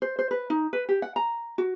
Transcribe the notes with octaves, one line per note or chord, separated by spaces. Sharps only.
C5
C5
B4
D#4
B4
G4
F#5
A#5
F#4